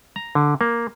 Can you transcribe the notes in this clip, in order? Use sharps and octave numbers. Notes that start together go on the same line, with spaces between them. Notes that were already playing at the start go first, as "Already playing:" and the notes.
A#5
D3
A#3